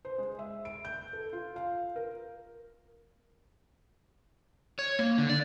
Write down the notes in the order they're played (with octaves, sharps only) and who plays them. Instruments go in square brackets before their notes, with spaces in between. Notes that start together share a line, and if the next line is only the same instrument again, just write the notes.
[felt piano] C5
G#3
E5
D7
G6
A4
F4
F5
A#4
[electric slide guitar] C#5
A#3
D3
D5